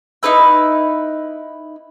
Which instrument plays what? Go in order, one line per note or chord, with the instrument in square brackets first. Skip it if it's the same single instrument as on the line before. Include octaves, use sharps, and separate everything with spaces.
[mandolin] D#4 E4 B4 E6